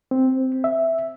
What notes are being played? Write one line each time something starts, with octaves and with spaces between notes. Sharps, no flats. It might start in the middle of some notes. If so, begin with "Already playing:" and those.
C4
E5